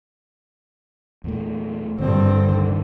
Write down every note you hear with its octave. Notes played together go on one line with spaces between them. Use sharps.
E2 A#2 A3
G#1 G2 A#2 D3 C4
E1 C#2 D#3